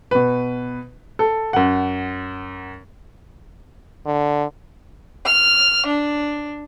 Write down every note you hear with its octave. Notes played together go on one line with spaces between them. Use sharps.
B2 B4
A4
F#2 F#5
D3
F6
D4